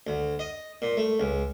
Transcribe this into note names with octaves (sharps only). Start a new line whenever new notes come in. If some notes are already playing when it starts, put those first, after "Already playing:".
D2
D#5
A#2
A3
C#2